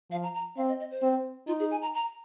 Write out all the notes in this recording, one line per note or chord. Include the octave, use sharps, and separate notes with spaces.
F3 F5
A#5
A#5
C4 F5
D#5
D#5
C5
C4
D#4 F4
G#4
G#5
A#5
A#5